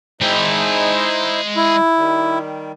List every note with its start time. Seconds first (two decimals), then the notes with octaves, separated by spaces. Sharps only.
0.21 G#3 D#4 E4 C5 G5
1.56 E4
1.97 D#3 G3